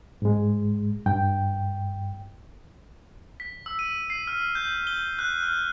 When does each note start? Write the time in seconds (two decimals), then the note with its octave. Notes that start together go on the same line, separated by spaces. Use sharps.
0.22 G#2 G#3
1.06 G2 G5
3.40 B6
3.66 E6
3.79 D#7
4.10 C7
4.27 F6
4.55 G6
4.87 G7
5.19 F#6
5.43 F6